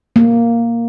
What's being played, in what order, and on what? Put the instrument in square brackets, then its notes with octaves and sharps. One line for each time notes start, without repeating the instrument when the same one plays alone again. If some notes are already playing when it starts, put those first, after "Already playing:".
[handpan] A#3